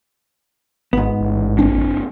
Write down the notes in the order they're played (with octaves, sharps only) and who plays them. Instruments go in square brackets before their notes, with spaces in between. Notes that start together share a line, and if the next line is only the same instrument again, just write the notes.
[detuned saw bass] G#1 [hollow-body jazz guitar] G#2 B3
[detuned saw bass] A1
[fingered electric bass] F#1 C4 D4